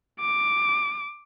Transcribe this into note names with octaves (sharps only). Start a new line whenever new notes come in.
D6